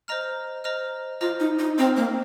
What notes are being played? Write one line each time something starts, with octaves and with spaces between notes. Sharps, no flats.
C5 D#5 A#5 F6
C5 D#5 A#5 F6
F4 C5 D#5 A#5 F6
D#4
D#4
C4 C5 D#5 A#5 F6
A#3